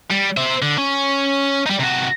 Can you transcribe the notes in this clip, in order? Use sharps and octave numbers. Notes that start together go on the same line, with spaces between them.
G3
C5 E5
D3
C#4
G3 D#4
C3 F#4